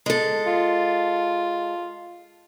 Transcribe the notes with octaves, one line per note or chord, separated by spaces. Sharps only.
G#3 A4
F4